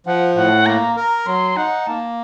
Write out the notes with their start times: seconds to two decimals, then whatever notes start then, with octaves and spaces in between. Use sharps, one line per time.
0.06 F3 F#5
0.35 A2 F#5
0.66 A#3 A#5
0.96 A#4 A#5
1.26 F#3 C6
1.56 D#4 F#5
1.87 A#3 A5